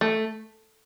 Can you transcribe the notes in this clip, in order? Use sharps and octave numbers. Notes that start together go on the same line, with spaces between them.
A3